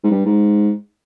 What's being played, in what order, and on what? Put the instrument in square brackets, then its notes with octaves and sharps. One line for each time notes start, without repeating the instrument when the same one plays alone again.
[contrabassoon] G#2
G2
G#2